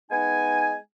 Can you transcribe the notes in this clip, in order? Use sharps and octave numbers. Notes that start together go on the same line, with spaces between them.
G#3 B3 D#4 G#5